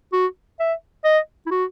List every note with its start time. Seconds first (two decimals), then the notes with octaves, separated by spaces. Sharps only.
0.13 F#4
0.60 E5
1.05 D#5
1.47 E4
1.51 F#4